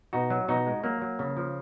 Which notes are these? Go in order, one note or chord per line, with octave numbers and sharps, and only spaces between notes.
B2 D#4 F#4
F#3
B2 D#4 F#4
G#3
F#3 A#3
F#3
C#3
F3